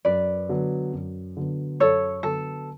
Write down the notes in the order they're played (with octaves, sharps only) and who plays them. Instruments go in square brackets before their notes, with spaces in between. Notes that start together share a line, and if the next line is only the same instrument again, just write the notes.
[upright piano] F#2 [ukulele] B4 D5
[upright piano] D3 F#3 B3
F#2
D3 F#3 B3
[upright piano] F#2 [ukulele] A4 C#5
[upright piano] D3 F#3 B3 [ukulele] A4